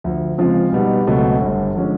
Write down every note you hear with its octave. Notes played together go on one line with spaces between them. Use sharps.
D2 D3 F3
C#3 F3 G#3 C4 F4
B2 G3 B3 D#4
C#2 B2 F#3 A3 C4
G1 G2 D3
D3 F3 G#3 C#4